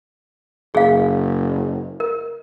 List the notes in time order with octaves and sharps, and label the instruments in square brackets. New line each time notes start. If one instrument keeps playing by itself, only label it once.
[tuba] F#1 [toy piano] G#4 F5
[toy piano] A#4